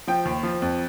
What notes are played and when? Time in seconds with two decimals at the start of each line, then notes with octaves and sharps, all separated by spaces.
0.07 F3 G5
0.25 D#2
0.43 F3
0.62 F2